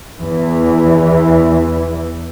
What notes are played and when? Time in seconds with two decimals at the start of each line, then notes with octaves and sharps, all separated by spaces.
0.20 E2 E3